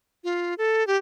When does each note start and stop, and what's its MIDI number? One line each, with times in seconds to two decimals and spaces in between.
0.24 0.54 65
0.58 0.86 69
0.87 0.97 67